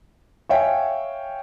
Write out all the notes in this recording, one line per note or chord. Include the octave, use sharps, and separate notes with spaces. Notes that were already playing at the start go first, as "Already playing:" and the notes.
C#5 E5 F5 G5 G#5